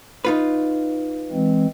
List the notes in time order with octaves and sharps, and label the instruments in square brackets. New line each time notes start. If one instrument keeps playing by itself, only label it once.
[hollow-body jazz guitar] D#4 F4 B4
[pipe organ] E3 G#3 C4